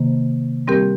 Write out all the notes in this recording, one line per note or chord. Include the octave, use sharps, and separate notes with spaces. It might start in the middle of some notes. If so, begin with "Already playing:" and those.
Already playing: C3 D#3 A#3
G3 C4 G4 A#4